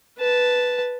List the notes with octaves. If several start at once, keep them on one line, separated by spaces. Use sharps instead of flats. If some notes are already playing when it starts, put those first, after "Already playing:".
B4 A5